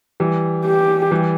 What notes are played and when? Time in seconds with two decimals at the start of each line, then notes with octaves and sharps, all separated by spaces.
0.20 E3 G3
0.65 G4
1.11 E3 G3